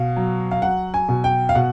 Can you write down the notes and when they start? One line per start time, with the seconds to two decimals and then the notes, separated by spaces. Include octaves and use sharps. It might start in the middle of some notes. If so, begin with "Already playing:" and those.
Already playing: B2 F5
0.16 F#3
0.51 F5
0.62 F#3 F#5
0.94 G#5
1.09 B2
1.24 G5
1.49 F5
1.55 B2 F#5